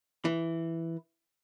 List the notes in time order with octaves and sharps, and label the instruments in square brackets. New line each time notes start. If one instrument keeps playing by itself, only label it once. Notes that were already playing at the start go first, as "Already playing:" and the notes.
[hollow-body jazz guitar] E3